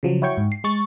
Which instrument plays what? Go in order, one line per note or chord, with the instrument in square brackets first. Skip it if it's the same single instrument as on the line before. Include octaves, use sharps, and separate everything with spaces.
[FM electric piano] C#3 F3 F#3
E4 F#4 C#5 G5 C#6
G#2
C7
G#3 C#6 A6